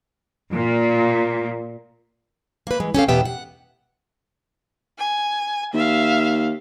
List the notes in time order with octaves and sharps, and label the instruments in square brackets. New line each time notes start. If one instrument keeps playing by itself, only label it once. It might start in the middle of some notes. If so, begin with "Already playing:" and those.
[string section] A#2
[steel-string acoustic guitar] A#3 B4
E3 G#3
C#4 G4 A4 F5
E2 B2 B3 G4 E5 G5
F#5
[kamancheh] G#5
[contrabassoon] D#2 [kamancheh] E5 F5